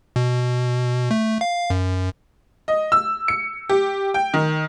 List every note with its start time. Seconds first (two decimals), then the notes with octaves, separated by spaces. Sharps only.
0.16 B2
1.11 A3
1.41 F5
1.70 F#2
2.68 D#5
2.92 E6
3.28 C#7
3.69 G4
4.14 G5
4.34 D#3